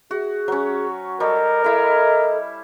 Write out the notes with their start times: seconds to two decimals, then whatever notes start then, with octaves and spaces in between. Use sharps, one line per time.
0.11 F#4 G#4
0.48 F#3 C#4
1.20 G3 A4 A#4 D#5
1.64 E4 A4 D#5 F5